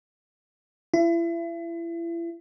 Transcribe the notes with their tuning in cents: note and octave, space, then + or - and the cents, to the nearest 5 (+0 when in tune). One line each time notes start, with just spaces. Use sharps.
E4 +35